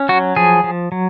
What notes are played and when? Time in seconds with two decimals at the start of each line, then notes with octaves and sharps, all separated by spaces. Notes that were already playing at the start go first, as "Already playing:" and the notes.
Already playing: C#4
0.09 F#3 F#4
0.36 F3 G#4
0.64 F3
0.92 F#3